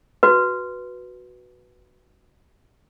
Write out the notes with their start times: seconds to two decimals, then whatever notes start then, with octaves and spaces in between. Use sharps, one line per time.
0.23 F#4 B4